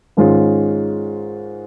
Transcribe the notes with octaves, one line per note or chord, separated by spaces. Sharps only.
G#2 D#3 G#3 C#4 F4